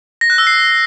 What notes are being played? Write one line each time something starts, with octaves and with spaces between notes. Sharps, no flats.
A#6
F#6
E6
C7